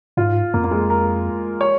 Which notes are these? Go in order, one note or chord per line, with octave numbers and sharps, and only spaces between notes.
G#2 F4
F2 A#3
A#3
G#3
A#4
C#5